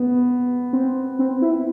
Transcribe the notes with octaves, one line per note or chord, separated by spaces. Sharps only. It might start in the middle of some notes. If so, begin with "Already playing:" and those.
Already playing: B3
C4
C4
E4